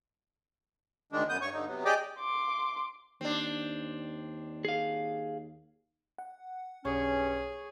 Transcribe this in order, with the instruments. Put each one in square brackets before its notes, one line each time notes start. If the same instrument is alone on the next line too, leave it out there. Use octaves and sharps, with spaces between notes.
[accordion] D2 D#3 G#3 D4
F#2 B3 D#6 G6
G2 C#5 C#6
G2 D3 D#4
C3 F#3 B3
G4 G#4 D5 D#5 G5 D6
[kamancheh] C6 D6
[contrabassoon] D#2 [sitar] C4 D4
[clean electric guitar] G#4 F5
[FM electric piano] F#5
[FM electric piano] B1 [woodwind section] G2 C#4 [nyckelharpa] G#4 [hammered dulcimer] C#5